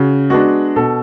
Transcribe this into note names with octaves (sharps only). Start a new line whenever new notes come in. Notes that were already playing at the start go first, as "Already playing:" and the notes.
Already playing: C#3 F#4
G#3 B3 D4 F#4
B2 A4